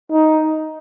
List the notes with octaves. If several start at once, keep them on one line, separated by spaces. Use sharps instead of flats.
D#4